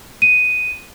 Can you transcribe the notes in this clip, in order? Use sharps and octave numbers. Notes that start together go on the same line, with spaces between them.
D#7